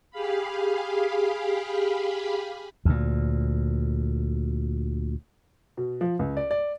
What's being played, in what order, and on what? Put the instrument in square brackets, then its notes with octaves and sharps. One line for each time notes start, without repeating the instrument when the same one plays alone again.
[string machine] G4 G#4 F5 B5
[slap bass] D2 A#2
[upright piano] B2
F3
C#2
D5
D5